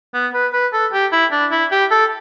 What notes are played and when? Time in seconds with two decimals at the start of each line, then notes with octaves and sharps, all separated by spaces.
0.14 B3
0.34 B4
0.53 B4
0.73 A4
0.93 G4
1.12 E4
1.32 D4
1.52 E4
1.72 G4
1.91 A4